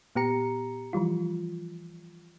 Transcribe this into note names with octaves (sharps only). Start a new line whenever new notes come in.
A#2 B3 G4 A#5 C#7
E3 F3 G3 F4